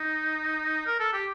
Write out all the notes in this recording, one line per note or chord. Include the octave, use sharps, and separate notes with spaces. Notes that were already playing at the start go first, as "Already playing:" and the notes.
Already playing: D#4
A#4
A4
G4